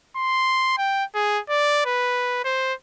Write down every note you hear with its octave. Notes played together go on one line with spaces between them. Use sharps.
C6
G5
G#4
D5
B4
C5